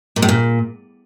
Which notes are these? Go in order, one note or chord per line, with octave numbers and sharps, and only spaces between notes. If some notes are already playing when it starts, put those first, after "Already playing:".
A#2
A2
A#2